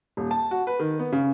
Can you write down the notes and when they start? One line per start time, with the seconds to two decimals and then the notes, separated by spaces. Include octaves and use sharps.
0.17 D#1
0.31 A5
0.51 F#4
0.67 B4
0.80 D#3
0.99 B3
1.12 C#3